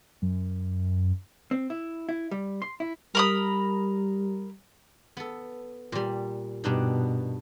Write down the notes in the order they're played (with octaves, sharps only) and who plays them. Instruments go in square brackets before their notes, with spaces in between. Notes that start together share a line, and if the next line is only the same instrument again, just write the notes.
[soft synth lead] F#2
[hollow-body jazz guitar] C4
E4
E4
G3
C6
E4
[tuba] G3 [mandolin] A#4 B5 D#6
[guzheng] B3 A4
A#2 G3
[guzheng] G2 D4 D#4 [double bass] B2